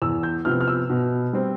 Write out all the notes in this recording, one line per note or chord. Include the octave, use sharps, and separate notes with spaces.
E2 E6
G6
C3 F3 B3 F6
F6
E6
B2
G3 C4